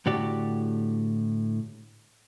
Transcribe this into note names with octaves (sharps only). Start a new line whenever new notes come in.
A2 D3 F#4 G4 D5